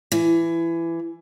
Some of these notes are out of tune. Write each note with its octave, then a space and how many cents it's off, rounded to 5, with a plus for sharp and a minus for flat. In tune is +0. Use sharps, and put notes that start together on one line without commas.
E3 +20